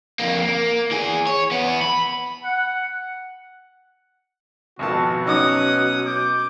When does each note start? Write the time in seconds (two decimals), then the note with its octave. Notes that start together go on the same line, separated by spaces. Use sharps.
0.20 F2 A#3
0.42 A#3
0.91 E3 G#4
1.27 C#5
1.51 E2 B3
1.81 B5
2.44 F#5
4.79 G#1 F2 B2 F#4 A5
5.26 F#3 C#4 D#4 D6 D#6 F#6
6.07 D6 G6